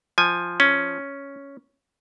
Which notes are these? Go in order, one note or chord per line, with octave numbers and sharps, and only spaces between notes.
F3 G#5
C#4